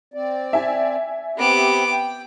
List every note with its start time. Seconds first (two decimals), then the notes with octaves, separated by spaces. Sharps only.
0.14 C4 D5
0.53 E5 G#5
1.38 B3 C4 G4 D6
1.92 G5